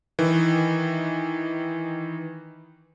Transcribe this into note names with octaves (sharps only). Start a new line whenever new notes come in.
D#3 E3